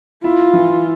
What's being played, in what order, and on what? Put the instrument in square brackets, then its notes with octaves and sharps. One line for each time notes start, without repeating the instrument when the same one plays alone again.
[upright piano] E4 [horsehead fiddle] F4
[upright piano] E3